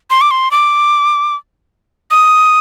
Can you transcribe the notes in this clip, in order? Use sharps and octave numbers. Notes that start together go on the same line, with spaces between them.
C6
D6
C6
D6
D#6